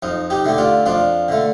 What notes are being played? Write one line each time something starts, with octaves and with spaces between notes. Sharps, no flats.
F2 D#4
D#4 G4
D3 A3 G4
D4 F4
F2 D4 F4
D3 A3